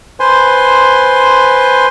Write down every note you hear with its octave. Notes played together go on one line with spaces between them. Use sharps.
B4 C5 G#5 C6